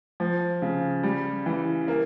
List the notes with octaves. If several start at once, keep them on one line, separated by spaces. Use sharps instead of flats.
F3
C#3
G3
E3
A#3